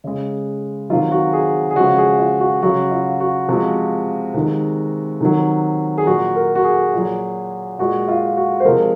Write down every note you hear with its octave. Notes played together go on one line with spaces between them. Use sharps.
C#3 G#3
C3 D#3 F#3 F4
F#4
G#4
G#4
C#3 F3 G#3 F#4
G#4
F4
F#4
C#3 F#3 F#4
F4
F#4
C3 F3 G#3 F#4
C3 D#3 G#3
C3 D#3 F#3
G#4
A#2 F#3 F#4
A#4
F#4
G#4
A#2 F#3
A#2 G#3 F#4
F4
F#4
C5
C3 F3 G#3 A#4